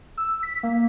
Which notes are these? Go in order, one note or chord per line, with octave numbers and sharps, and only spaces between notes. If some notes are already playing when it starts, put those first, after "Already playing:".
E6
B6
A#3